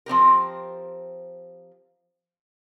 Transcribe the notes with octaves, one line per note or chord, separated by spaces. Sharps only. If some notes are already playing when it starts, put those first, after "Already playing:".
F3 C4 G4 A#4